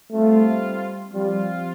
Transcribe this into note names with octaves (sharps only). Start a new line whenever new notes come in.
G3 A3 C4 F4
F3 G3 C4 F4